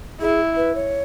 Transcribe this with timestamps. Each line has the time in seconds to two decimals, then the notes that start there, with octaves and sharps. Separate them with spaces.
0.21 E4 G#4
0.57 B4
0.75 C#5